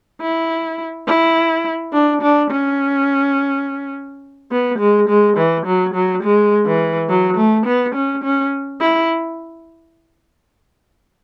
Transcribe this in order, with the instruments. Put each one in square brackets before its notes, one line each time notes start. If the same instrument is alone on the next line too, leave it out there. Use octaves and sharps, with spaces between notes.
[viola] E4
E4
D4
D4
C#4
B3
G#3
G#3
E3
F#3
F#3
G#3
E3
F#3
A3
B3
C#4
C#4
E4